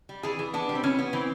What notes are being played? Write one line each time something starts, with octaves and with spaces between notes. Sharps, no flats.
G3
E3 G#4
E3
B3 D4
G3
C4
E3 C#4
B3
E3 C4